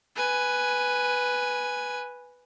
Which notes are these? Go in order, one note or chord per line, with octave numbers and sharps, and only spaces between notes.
B4 G#5